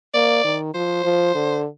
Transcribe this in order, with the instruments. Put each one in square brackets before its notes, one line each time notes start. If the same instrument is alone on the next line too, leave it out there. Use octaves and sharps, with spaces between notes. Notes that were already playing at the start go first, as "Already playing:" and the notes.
[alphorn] A#3 [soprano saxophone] D5
[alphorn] D#3
[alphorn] F3 [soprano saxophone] C5
[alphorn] F3
D3